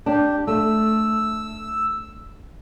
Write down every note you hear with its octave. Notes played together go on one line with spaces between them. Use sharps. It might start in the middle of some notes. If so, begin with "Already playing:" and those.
D4 G4
A3 E6